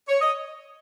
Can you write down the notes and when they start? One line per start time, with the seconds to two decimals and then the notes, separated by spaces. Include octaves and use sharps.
0.08 C#5
0.21 D#5